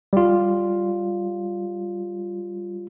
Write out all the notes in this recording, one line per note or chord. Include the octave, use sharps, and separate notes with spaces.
G3 F4